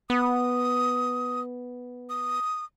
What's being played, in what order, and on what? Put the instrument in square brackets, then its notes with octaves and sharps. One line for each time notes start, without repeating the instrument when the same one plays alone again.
[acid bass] B3 [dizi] D#6
[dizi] D#6